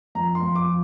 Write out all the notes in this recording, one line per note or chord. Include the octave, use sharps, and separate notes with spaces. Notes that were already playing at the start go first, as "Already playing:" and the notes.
F2 A#5
C6
F2
D6
F3